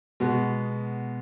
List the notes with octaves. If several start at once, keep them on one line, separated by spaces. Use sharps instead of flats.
B2 G#3 B3 F#4